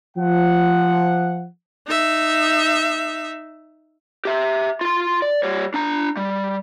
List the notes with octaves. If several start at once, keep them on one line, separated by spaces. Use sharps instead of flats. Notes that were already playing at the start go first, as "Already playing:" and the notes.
F3 F#5
D#4 E5
G4 E5
F4 C6
D5
G3 C#5
D4 A#5
G3